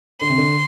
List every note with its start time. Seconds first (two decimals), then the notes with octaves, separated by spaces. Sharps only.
0.21 D3 C6
0.30 C3
0.38 D3